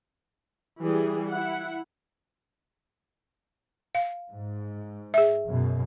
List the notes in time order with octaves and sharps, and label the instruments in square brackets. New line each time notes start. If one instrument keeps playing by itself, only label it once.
[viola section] E3 G3 G#4
E4 F#5
[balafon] F5
[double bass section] G#2
[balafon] G#4 E5
[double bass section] F#2 B2